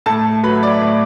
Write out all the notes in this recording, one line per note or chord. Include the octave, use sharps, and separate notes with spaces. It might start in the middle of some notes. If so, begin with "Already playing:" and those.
A2 A4 A5
F#3 A3 B4 B5
D5 D6
A2